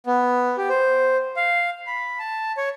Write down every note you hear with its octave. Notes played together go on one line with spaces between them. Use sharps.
B3
G4
C5
F5
B5
A5
C#5